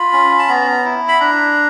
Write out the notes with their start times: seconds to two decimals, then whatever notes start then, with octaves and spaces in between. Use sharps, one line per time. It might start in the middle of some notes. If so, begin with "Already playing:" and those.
Already playing: F4 B5
0.13 C#4
0.39 A5
0.48 B3 A#5
0.85 E4
1.08 B5
1.20 D4 A#5